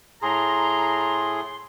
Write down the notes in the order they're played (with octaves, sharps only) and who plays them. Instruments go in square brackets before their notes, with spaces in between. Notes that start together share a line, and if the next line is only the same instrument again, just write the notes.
[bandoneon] A2 G#4 [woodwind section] A#5 [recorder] C6